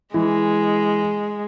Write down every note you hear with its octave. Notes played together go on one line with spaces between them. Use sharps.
E3 G#3